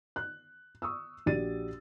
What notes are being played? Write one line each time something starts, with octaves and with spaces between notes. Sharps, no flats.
F#6
C#6 D#6 E6
A#1 F#4 G4 D5 A6 D#7